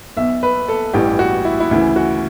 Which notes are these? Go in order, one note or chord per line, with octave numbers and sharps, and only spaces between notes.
B1 B2 E5
B4
A4
A1 G2 E3 G4
F#4
E4
E4
D2 C#3 E3 E4
F#4